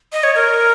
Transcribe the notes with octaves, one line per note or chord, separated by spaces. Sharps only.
D#5
C#5
A#4